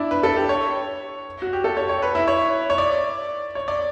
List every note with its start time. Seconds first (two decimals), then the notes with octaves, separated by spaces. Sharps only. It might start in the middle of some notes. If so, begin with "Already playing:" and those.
Already playing: D4 E4
0.11 B4
0.23 A4
0.36 G4
0.49 C#5
1.42 F#4
1.53 G4
1.64 A4
1.77 C#5
1.89 C#5
2.02 B4
2.15 E4
2.28 C#5
2.70 C#5
2.78 D5
3.55 C#5
3.68 D5